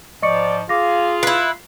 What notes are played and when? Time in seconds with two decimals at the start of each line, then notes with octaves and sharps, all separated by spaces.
0.22 G#2 F3 D5 D#5 C#6 C#7
0.69 F4 G#4 F5 D6 A#6
1.23 E4 B4 C7